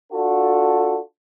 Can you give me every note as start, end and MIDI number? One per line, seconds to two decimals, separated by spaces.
0.12 0.98 62
0.12 0.98 65
0.12 0.98 66
0.12 0.98 69